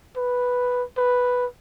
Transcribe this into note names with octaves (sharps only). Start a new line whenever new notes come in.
B4
B4